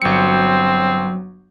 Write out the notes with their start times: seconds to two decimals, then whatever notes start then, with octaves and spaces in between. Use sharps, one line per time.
0.02 G1 F#3 C4 C#7